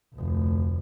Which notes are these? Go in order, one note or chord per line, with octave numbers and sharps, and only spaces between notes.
F1 D2